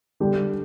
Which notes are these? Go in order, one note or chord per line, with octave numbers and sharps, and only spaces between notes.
D3 G3 D4 G4